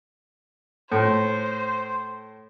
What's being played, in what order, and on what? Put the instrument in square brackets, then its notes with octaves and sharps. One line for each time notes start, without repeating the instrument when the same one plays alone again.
[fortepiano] A2 [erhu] C5